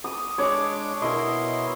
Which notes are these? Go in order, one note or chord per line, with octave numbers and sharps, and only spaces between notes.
D#6
G#3 D4 C#5 D6
B2 E4 A#4 D#5 C6